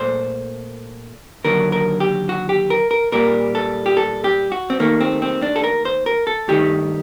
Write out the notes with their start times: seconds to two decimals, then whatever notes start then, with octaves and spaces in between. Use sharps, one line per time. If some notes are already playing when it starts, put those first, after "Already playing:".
Already playing: A#2 A3 C5
1.44 D#2 D3 F#3 A#4
1.72 A#4
2.00 G4
2.29 F#4
2.49 G4
2.70 A#4
2.91 A#4
3.12 A#2 G3 A#3 A#4
3.55 A4
3.86 G4
3.97 A4
4.24 G4
4.52 F#4
4.70 C4
4.80 D#2 D#3 A3 A#3
5.00 C4
5.22 C4
5.42 D4
5.56 A4
5.64 A#4
5.85 C5
6.06 A#4
6.27 A4
6.48 G2 D#3 A3 G4